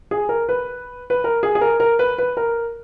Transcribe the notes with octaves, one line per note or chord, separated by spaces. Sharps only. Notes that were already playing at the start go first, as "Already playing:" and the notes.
G#4
A#4
B4
B4
A#4
G#4
G#4
A#4
A#4
B4
B4
A#4